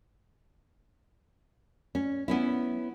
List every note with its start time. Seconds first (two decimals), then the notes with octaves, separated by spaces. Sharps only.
1.95 C#4
2.28 B3 C#4 E4